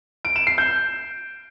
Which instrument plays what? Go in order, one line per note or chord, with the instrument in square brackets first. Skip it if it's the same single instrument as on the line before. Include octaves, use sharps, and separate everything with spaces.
[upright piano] D7
E7
C7
G6